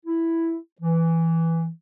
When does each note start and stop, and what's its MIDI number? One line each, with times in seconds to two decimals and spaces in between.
0.06 0.57 64
0.81 1.69 52